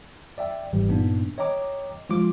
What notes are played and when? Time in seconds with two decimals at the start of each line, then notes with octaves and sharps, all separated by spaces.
0.38 D5 E5 G5
0.73 G1 G#2 E3 G3
0.89 G2 A#2 A#3 B3 D4 D#4
1.38 C#5 D#5 G5 A#5 D6
2.09 F3 G#3 F4 D6